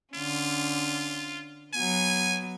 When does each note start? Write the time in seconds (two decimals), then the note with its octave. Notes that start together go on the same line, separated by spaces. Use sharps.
0.14 D3 C#4 F4
1.74 F#3 B3 G#5